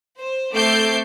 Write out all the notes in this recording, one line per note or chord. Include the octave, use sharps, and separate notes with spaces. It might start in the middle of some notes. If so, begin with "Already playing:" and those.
C5
A3 C4 A4 D6 G6 C7